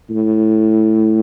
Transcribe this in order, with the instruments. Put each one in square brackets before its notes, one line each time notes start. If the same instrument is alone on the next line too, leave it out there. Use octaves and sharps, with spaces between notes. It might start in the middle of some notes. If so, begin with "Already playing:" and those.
[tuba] A2